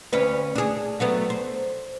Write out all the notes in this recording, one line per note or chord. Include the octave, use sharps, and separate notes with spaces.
D2 C#4 B4
D4 G#4
F#3 A3 B3
C5